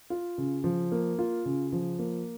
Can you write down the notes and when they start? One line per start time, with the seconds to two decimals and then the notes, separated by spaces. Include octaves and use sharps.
0.10 F4
0.38 C#3
0.64 F3
0.92 A#3
1.19 F4
1.45 C#3
1.73 F3
1.99 A#3